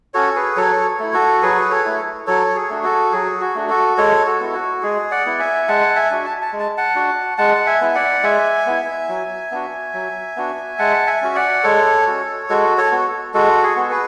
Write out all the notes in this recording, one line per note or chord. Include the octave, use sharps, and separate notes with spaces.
C#4 F#4 A4 C#5
G#4 B4
F#3 A4 C#5
A3 E4
F#4 A4
F#3 G#4 B4
A4 C#5
A3 E4
F#3 A4 C#5
G#4
A3 D4 F#4
F#4 A4
F#3 G#4
F#4
A3 D4 F#4
F#4 A4
G#3 A4 C#5
F#4 A4
B3 E4
F#4
G#3 G#4
D5 F#5
B3 E4
E5 G#5
G#3 F#5 A5
E5 G#5
D4 F#4
A5
A5
G#3
A5
F#5 A5
D4 F#4
G#3 F#5 A5
A5
E5 G#5
B3 E4
D5 F#5
G#3 E5 G#5
B3 E4
F#3
B3 D4 F#4
F#3
B3 D4 F#4
G#3 F#5 A5
E5 G#5
C#4 F#4
D5 F#5
G#3 A4 C#5
C#4 F#4
G#3 F#4 A4
A4 C#5
B3 F#4
G#3 F#4 A4
G#4
B3 F#4
G#4 B4